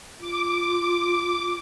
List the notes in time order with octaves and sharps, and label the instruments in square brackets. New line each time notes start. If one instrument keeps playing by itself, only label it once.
[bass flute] F4 [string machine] D6